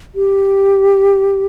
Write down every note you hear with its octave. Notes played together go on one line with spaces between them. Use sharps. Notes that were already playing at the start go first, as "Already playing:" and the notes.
G4